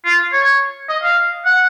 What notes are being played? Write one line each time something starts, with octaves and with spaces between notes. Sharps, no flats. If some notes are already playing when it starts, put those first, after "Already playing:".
F4
C#5
D#5
F5
F#5